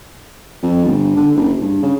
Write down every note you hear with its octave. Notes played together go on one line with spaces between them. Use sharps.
F2
G1
D3
F#1
G2
C#3